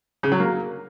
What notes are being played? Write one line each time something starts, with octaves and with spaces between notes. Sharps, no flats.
C#3
F#3
A#3